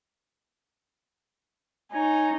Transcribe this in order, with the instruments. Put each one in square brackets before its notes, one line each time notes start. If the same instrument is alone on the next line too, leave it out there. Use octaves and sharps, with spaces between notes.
[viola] D#4 [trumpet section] C#5 G#5 A#5